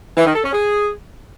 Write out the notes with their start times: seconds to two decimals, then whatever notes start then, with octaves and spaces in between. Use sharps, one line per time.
0.17 E3
0.26 D#3
0.35 A4
0.44 C#4
0.52 G#4